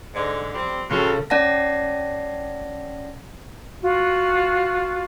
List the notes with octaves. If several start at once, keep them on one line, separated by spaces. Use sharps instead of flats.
G#2 D3
F2 G3 C4
F2 C#3 F4 F#4 A4
C#4 D5 F#5 A5 A#6
F4 F#4